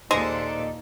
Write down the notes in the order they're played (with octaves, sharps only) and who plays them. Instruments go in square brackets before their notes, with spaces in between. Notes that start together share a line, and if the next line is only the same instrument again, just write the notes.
[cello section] D#2 A#2 A4 [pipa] G#3 [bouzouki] D4 C5 [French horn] D#4